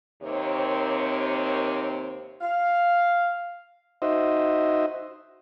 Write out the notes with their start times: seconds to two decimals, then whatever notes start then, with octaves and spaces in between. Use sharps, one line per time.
0.23 D#2 C3 A#3 C4 C5 C#5
2.41 F5
4.02 D#4 F#4 C5 D#5 E5